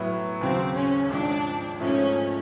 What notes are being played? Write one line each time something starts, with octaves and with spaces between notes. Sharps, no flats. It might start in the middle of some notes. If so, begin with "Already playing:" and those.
Already playing: A2 F#3 B3 E4
D#2 C#3 F#3 C4
C#4
G#1 G#2 F3 D4
G#2 F3 A3 C#4